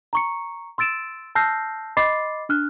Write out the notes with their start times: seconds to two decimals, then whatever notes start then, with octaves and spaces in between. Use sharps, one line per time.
0.13 A#5 C#6 C#7
0.78 C6 E6 A6 D7 E7
1.35 A5 E6 F6 G6 A#6 C7
1.97 D#5 B5 C6 D6 A6 C7
2.49 D4 F6 F#6